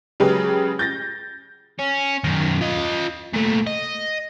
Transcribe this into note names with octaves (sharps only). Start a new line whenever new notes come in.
C#3 F#3 G#3 G4 B4
G6 A6 A#6
C#4
F#2 D#3
F4 D#5
A#2 A3
D#5